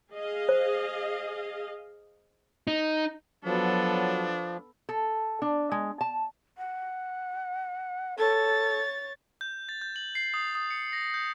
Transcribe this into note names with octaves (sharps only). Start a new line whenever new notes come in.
G#4 D#5 F5
C5
D#4
F3 F#3 B3 D4 A4
A4
D4
G#3
A5
F#5
A4 C#5 A6
G6
A6
G6
F#7
C7
D#6
D#6
C#7
A#6
G6